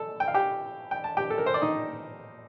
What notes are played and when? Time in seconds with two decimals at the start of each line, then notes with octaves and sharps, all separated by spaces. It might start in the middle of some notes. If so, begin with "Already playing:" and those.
Already playing: A4 A5
0.20 G5
0.28 F5
0.34 G4 G5
0.91 G5
1.04 A5
1.17 G4 G5
1.30 A4
1.38 A#4
1.46 C5
1.54 D5
1.62 D#4 D#5